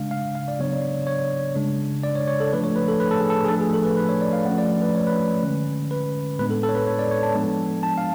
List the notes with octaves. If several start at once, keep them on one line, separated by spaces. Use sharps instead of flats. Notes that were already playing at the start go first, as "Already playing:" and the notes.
Already playing: C#3 G#3 D4 F5
F5
F5
D5
C#3 F#3 B3 D4 C#5
D5
C#5
C#3 G#3 D4
D5
C#5
C#5
A4
F3 A3 D4 B4
C#5
B4
A4
B4
A4
G#4
A4
G#4
F3 A3 D4 A4
G#4
A4
B4
B4
C#5
D5
F5
F3 A3 C#4 F#5
D5
B4
C#5
B4
D3 G#3 C#4
B4
A2 G#3 B3 D4 B4
A4
A4
C#5
B4
C#5
D5
C#5
A5
F3 G#3 B3 D4
A5
F5